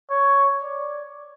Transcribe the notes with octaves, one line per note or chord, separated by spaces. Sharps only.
C#5
D5